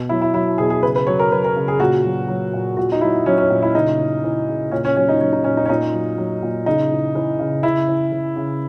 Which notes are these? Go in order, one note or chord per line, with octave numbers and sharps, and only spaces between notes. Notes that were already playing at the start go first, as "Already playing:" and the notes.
Already playing: B2
F#3 E4
E4
F#3 E4
B2 G#4
G#4
C#3 B4
B4
F#3 C#5
A#4
F#3 B4
A#4
C#3
G#4
A#2 F#4
F#3
F#3
A#2
A#2 F#4
D#4
F#3 E4
F#3 C#4
C#4
A#2
E4
C#3 D#4
E3
E3
C#3
A#2 C#4
C#4
F#3 C#4
D#4
F#3 C#4
D#4
A#2 C#4
D#4
C#4
A#2 D#4
F#3
F#3
A#2
C#3 D#4
E3
E3
C#3
C#3 E4
E3
E3
C#3